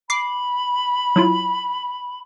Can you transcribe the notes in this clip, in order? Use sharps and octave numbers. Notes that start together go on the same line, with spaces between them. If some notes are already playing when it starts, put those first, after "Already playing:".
B5 D6 C7
F#3 E4 F4